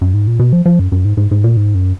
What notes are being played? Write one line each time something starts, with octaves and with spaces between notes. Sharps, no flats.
F#2
G#2
A#2
B2
F3
F3
F#2
F#2
G#2
G#2
G#2
A#2
G#2
F#2